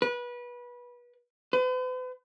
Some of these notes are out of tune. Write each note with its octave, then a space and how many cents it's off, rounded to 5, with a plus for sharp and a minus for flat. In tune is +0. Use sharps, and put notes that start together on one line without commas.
B4 -25
B4 +45